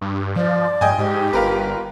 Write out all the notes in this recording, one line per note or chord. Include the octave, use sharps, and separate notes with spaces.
G2
F3 D5
G2 D#5 G5 G#5
G#2 G4
G1 F4 A#4 B4